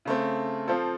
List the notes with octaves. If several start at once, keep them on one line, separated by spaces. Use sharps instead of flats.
C#3 A3 C4
F3 C4 F4 A4 C5